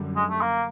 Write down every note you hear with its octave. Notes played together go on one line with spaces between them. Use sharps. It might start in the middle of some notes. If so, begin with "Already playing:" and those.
Already playing: F#2 D3 G3
G#3
A3
A#3